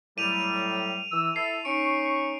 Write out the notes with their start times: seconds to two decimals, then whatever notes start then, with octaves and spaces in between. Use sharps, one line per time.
0.18 A2 F#3 G3 D#7 F7
1.11 E3 E6
1.36 E4 A4 C7
1.65 C#4 D#4 C#6 D7